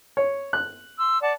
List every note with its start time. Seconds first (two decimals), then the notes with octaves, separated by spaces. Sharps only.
0.17 C#5
0.53 F#6
0.99 C6 E6
1.21 D5 F#5 A5